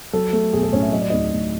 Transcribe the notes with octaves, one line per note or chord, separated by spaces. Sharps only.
F#3 A4
A3
B1 G#4
A4
A2 C#4 C#5
E5
F#3 D#5
D5
D2 D#4 D#5
D2